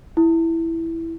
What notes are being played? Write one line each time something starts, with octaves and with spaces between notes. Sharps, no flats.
E4